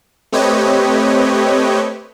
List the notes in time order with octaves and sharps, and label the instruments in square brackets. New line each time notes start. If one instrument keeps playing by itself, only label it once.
[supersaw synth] A3 C4 G4 B4 C#5 D#5